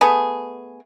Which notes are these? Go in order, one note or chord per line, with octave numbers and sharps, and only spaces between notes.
A3 B3 G#4